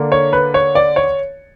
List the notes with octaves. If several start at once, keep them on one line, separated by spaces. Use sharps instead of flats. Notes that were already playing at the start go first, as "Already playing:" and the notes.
Already playing: D3 A#3 D4
C#5
B4
C#5
D5
C#5